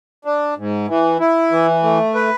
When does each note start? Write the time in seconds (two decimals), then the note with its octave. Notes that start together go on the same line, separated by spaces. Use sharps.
0.25 D4
0.57 G#2
0.88 E3
1.20 E4
1.51 E3
1.83 A3
2.15 B4